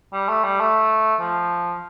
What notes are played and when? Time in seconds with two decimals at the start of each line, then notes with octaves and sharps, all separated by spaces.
0.13 G3
0.29 A3
0.44 G3
0.60 A3
1.21 F3